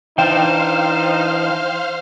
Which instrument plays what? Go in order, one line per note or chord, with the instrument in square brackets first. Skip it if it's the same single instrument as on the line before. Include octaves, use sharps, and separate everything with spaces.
[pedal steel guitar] E3 D4 [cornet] D#4 [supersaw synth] C5 F5 F6 [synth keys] G5 E7